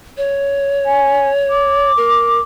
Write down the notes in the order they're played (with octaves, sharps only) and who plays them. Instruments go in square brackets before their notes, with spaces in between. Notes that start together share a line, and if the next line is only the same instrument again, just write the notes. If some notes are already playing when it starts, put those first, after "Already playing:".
[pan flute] C#5
[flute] G#5
D6
[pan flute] A#4